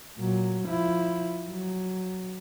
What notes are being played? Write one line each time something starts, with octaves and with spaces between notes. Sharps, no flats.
A#2 F#3
F3 E4
F#3